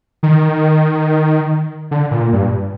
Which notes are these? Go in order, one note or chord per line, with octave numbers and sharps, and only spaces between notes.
D#3
D3
A#2
G2